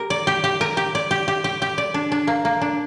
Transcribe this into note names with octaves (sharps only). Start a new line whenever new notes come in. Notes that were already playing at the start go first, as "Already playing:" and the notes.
Already playing: G4 A#4
D5
G4
G4
A#4
G4
D5
G4
G4
G4
G4
D5
D4
D4
A#3
A#3
D4